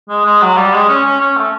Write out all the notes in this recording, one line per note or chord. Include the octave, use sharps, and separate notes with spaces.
G#3
G#3
F#3
G3
G#3
C#4
C#4
C#4
A3